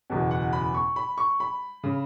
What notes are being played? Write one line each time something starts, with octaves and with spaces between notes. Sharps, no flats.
F#1 E2 B2
F#5
B5
C#6
B5
C#6
B5
C#3